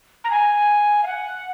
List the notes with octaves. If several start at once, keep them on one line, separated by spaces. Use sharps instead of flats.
A#5
G#5
F5
F#5